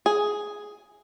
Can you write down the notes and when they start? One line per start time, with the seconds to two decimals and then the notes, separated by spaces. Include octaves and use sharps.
0.06 G#4